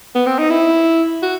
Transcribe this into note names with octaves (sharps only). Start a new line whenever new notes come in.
B3
C4
D#4
E4
F#4